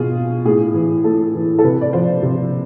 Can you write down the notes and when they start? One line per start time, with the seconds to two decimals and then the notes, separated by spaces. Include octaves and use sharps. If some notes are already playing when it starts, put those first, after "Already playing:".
Already playing: B2 F4 G#4
0.45 A2 G#4
0.74 E3
1.04 A2 A4
1.34 E3
1.59 A4
1.64 C3 B4
1.81 D5
1.93 F3 C5
2.23 C3